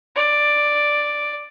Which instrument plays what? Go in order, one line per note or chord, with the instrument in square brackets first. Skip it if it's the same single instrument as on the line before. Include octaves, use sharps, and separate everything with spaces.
[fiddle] D5